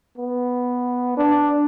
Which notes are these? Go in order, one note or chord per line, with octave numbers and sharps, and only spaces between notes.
B3
D4